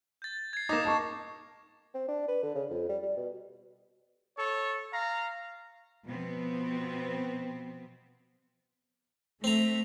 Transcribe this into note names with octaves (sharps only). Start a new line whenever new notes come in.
G6 A6
G#6 C7
A#3 D#4 D6 A#6 E7
A5 C#6
C4
D4
B4
D3
C#3
F2
G3
G3
B2
A4 C#5
F5 A#5
B2 F3 B3 C4
A3 C4 A#5